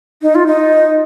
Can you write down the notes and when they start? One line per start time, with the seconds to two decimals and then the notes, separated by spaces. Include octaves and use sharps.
0.22 D#4
0.35 F4
0.47 D#4